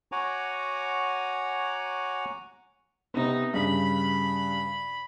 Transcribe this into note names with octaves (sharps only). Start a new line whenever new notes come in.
F#4 C#5 F#5 G#5 A#5 D6
C3 B3 D#4
G2 C#3 B5 B6